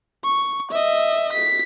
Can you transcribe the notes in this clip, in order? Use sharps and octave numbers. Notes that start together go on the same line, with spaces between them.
C#6
D#5 E5
B6